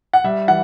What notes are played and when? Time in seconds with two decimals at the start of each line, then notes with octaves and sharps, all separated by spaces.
0.13 F#5
0.24 G3 E5
0.48 E3 F#5